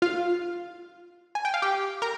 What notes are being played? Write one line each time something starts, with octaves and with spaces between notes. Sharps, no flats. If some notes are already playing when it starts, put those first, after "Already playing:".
F4 F5
G#5
G5
F5
G4 G5
A#4 A#5